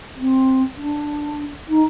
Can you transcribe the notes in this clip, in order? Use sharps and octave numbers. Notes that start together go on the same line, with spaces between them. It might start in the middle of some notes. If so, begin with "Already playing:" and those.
C4
D4
D#4